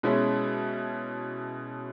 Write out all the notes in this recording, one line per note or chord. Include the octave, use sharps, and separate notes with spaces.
B2 G#3 C#4 E4